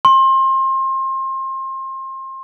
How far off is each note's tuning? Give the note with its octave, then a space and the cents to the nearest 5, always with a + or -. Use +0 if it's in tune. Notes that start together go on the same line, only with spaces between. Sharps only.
C6 +30